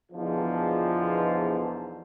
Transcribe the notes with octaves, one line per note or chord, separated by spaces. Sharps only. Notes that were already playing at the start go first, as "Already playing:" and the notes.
E2 G#2 B2 D3 F3